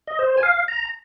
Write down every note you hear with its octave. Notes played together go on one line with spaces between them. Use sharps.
D#5
C5
G#5
F5
A#5